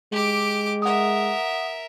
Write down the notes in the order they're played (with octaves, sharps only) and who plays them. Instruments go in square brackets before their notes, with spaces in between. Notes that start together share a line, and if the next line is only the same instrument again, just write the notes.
[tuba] G#3 [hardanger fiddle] G4 D6
[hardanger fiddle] A#4 E5 [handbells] F#5 D#6